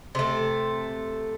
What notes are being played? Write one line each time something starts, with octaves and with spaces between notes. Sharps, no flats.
C3 A3